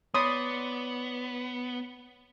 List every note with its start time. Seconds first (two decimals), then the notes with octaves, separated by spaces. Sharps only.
0.14 B3 E4 C#5 D5 C6 D#6